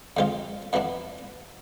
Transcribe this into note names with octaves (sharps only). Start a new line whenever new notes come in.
F2 D3 G#3 C4 F4
F2 E3 B3 D4